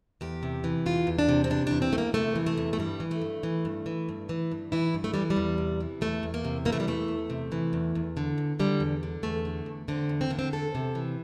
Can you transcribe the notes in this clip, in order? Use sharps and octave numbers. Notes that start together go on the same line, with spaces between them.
E2 G4
C3
E3
E2 F4
E2
D4
C3
C4
E3 D4
E2 D4
C4
E2 A3
A#3
C3 A3
E3
A3
E2
A3
G2 G3
E3
A3
G2
E3
G2
E3
G2
E3
G2
E3 E4
G2
A3
E3 G3
G3
E2
C3
E3
E2 A3
E2
A#3
C3
E3 A#3
A3
G3
E2 A3
E2
C3
E3
E2
E2
D3
E2
D3 G3
E2
D3
E2 A3
D3
E2
D3 C4
E2
C4
D3 A#3
C4
E2 A4
C3
E3